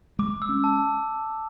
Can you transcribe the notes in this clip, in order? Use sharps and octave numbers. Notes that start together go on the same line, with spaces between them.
G#3 D6
E6
C#4
A5